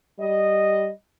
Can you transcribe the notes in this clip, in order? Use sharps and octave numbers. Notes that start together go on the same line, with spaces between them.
G3 D#5